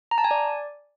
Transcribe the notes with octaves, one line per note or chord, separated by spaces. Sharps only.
A#5
A5
G#5
D5